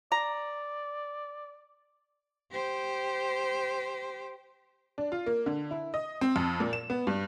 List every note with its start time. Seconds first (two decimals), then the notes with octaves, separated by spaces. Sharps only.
0.12 D5 A#5
2.51 G4 C5
4.98 D4
5.12 F4
5.26 A#3
5.46 D3
5.71 E4
5.94 D#5
6.21 C4
6.36 F2
6.60 A#2
6.73 E7
6.90 B3
7.07 G2